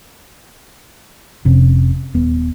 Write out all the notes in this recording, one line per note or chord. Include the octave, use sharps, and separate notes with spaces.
F1 C3 C#4
D#1 B3